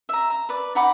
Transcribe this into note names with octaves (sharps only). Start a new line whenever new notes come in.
E5 A#5
A#5
B4 D5
D#4 F#5 B5 D6